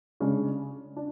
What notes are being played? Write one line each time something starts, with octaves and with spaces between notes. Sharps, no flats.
C#3 G#3 D4
D4